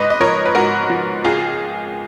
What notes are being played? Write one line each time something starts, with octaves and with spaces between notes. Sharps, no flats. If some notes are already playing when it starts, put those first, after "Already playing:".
Already playing: G#2 B4 D#5
D#5
F3 A#4 C#5
B4
G#2 F#4 A#4
F3
C#2 F4 G#4